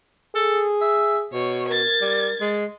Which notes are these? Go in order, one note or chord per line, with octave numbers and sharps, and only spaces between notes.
G#4 A4
E5
B2 C#5
A#4 G#6 A6
G3
G#3